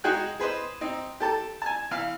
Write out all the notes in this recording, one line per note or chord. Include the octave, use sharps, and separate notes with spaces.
G#3 D#4 F#4 G#4 G5 F#6
G#4 B4 C5 D#5
C4 D#4
G4 A4 A5
G#5 A5
E3 F5